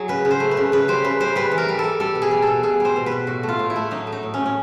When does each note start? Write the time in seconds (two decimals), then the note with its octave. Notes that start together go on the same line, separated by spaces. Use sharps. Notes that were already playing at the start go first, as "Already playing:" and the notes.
Already playing: F#3 G#4
0.08 C#3 B4
0.25 C#3
0.31 C5
0.40 A3
0.51 B4
0.57 C#3
0.72 C#3 B4
0.88 G3 C5
1.04 C#3 B4
1.20 G3 C5
1.36 G3 B4
1.52 E3
1.58 A#4
1.69 G3
1.79 G3 A4
2.00 G3 A4
2.15 B2
2.22 G#4
2.31 G3
2.42 B2 A4
2.63 B2 G#4
2.80 G3 C5
2.96 B2
3.06 B4
3.11 B2
3.27 A2 F#4
3.43 A3
3.49 F4
3.59 A2
3.70 E4
3.76 A3
3.91 F#3 D#4
4.07 A3
4.12 D#4
4.23 A2
4.34 C#4
4.39 A2
4.46 C#4